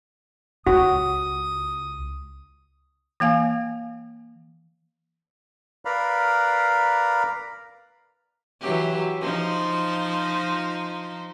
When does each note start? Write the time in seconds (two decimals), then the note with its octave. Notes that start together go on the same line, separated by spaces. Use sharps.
0.67 C#2 F#4 D#6
3.20 E3 A#3 F5 G#5
5.85 A#4 B4 D5 F5 A#5 B5
8.61 E3 F#3 G4
9.21 F3 D#4 C5